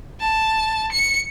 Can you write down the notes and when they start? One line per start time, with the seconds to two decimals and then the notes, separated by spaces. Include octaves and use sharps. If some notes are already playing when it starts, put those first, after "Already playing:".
0.21 A5
0.92 C#7